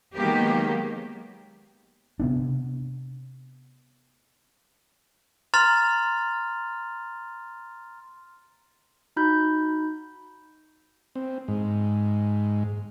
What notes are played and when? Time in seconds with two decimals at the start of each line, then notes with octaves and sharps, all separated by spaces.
0.14 D#3 F#3 G#3 A#3 B3 G4
2.19 C3 B3 D4
5.54 A#5 C6 F6 A6 F7
9.17 D#4 F#4 B5 G6
11.16 C4
11.48 G#2